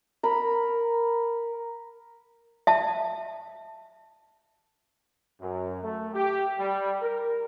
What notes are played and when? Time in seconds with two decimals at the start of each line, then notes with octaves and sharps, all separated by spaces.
0.23 A#4 B5
2.67 E5 A5
5.41 F#2
5.83 A3
6.14 G4
6.59 G3
7.02 A#4